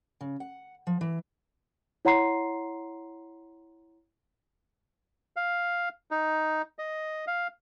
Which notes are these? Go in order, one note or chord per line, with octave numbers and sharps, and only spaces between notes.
C#3
F#5
F3
E3
E4 C#5 F#5 A#5 C6 C7
F5
D#4
D#5
F5